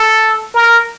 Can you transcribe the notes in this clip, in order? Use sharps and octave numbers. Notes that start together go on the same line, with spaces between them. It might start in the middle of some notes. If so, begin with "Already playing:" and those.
Already playing: A4
A#4